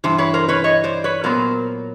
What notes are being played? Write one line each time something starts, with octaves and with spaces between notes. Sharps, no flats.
G2 E3 C5
B4 C#5
A#4 C5
B4 C#5
C#5 D#5
C5 D5
B4 C#5
A#2 F#3 B3 A#4 C5